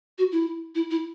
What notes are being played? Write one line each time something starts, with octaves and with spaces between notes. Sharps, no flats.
F#4
E4
E4
E4